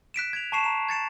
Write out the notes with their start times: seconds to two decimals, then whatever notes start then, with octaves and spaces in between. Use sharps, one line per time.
0.14 F#6 B6 D7 E7
0.33 G#6 D7 F7
0.52 A5 C#6 C7 E7
0.64 A#5 E7
0.89 G#6 A6 C#7 E7